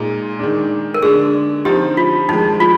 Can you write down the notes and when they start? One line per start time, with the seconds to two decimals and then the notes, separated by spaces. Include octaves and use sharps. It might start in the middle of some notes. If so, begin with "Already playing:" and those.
Already playing: A#2 G#3 D#4
0.39 D#3 G#3 D4
0.94 A#4
1.02 D3 G#3 D4 G#4
1.65 D3 F3 C4 D#4 G4
1.97 F4
2.29 F2 D#3 G#3 D#4
2.60 F4